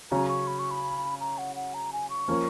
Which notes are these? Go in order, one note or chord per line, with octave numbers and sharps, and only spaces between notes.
C#3 F#3 C#4 A#5
C#6
B5
C#6
B5
A#5
F#5
F#5
A#5
G#5
C#6
F3 A#3 C#4